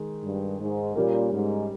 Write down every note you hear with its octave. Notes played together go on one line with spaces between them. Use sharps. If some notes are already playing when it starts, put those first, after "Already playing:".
Already playing: D#3 G#3
G2
G#2
A#2 G3 C#4 G4 A#4
G#2